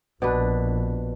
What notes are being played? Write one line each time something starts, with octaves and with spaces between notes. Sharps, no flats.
A#1 B2 D4 B4